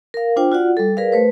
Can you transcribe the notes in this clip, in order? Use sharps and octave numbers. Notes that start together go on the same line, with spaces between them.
A#4 F5
D4 F4 C5 G5
F4 F#4 D5 F#5
G3 A4
G#4 A#4 B4 D5 F5
A3 B4 C5